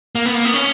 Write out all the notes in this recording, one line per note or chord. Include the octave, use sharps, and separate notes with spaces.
A#3
B3
A#3
B3
C#4